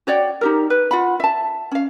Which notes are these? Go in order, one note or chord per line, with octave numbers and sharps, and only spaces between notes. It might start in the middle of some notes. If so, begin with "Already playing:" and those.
F#4 C#5 D5 G5
D#4 G4 A#4
B4
F4 F#5 B5
E5 A5
C#4 F5